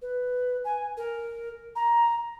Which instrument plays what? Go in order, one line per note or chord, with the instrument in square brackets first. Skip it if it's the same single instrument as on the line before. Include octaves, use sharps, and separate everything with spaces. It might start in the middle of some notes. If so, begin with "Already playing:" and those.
[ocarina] B4
G#5
A#4
A#5